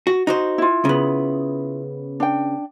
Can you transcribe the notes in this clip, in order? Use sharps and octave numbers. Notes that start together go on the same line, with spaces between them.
F#4
D#4 F#4 C5
E4 F4
C#3 B3
D4 G5